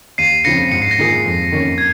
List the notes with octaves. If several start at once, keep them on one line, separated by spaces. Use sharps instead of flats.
D#2 C7 D#7
C#3 F3 C4 A#6 C#7
G#2 C#7
C7
A#6
D#3 A#3 F4 G#4 C7
F2
D#3 A#3 C#4
G#6